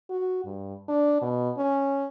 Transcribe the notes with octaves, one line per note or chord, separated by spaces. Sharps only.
F#4
G2
D4
B2
C#4